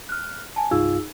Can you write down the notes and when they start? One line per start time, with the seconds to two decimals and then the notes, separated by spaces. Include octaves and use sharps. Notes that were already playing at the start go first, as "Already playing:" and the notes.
0.09 F6 F#6
0.56 G#5 A5
0.71 C2 G2 D#4 F4 G#4 E6